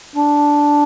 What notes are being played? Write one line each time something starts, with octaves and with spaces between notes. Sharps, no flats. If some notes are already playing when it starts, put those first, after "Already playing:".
D4